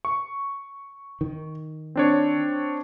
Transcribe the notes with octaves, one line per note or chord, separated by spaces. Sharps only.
C#6
D#3
C4 D4 C#5